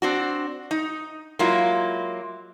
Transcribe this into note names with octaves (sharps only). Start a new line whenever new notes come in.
C4 D4 F#4
D#4
F#3 G#3 A#3 E4 F4